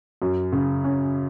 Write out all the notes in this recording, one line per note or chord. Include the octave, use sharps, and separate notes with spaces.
F#2
C#3
C#4